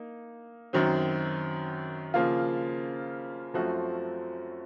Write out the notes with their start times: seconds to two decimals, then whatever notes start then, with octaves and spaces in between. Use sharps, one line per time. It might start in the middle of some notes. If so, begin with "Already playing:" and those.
Already playing: A#3 D#4
0.73 F#2 D#3 F#3 C4
2.14 C#3 F3 A#3 F4
3.54 F#2 F3 A3 C4 F#4